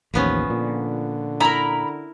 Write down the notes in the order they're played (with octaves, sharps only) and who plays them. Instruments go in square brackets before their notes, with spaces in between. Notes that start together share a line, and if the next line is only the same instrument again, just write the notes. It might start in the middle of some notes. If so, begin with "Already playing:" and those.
[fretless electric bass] A1 D#2 [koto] F3 B3 C#4
[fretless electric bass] A#2 [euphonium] D3
[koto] E4 A#4 [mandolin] A#5 B5